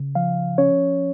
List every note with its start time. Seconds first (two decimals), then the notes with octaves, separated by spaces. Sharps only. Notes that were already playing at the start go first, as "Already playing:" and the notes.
Already playing: C#3
0.15 F3 F5
0.58 C#4 C#5